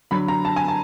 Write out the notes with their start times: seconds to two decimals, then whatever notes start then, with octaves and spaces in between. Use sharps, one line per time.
0.11 D3 F#3 B5
0.28 A#5
0.45 A5
0.56 G#5
0.68 A5